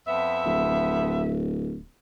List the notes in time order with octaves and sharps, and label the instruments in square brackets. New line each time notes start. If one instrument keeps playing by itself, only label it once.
[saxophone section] F2 B3 E5
[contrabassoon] D1